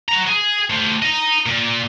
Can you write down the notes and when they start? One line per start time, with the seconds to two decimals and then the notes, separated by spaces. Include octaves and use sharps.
0.08 F#4 A#5
0.27 G#4
0.70 A3 C5
1.02 D#5 A#5
1.46 A#2